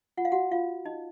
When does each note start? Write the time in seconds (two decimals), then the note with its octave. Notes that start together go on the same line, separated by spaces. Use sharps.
0.17 F4 F#5
0.25 F5
0.32 F#4 F#5
0.51 F4 F5
0.85 D#4 D#5